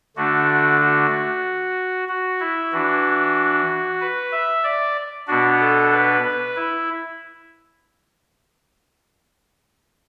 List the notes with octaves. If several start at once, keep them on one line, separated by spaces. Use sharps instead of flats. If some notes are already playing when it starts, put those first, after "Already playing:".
D3 A3 D4 F#4
F#4
F#4
E4
E3 D4 F#4
B4
E5
D5
B2 B3 D4 F#4
A4
B4
B4
E4